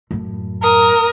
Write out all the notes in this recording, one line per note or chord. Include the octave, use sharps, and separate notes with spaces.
F#2 A2
A#4 D#6